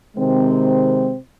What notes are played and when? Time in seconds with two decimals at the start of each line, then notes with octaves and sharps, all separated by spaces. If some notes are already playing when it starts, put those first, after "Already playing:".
0.17 C3 D#3 G#3 C4